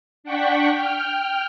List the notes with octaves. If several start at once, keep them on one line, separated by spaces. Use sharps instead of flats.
D4 F#5 G5 C#6 B6
G5 F6